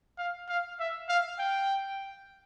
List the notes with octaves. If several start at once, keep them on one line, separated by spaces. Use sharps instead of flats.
F5
F5
E5
F5
G5